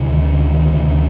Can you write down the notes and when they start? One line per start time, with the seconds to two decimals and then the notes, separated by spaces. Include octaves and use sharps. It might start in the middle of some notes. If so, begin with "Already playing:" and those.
Already playing: D2 C3
0.10 D#3
0.31 D3
0.51 D#3
0.72 D2 C3